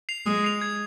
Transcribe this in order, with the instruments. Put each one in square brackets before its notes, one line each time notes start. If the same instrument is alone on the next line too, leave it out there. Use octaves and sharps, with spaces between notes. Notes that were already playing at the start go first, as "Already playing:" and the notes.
[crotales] C7 F7
[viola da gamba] G#3 [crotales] D#6
[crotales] C7 F7
G#6